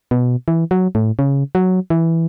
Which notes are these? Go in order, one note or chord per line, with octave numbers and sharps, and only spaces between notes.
B2
E3
F#3
A2
C#3
F#3
E3